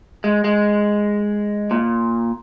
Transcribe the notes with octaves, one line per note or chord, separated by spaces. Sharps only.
G#3
G#3
A#2